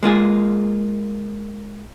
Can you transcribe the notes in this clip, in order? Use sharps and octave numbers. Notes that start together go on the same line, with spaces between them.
G#3 A#3 F4 G#4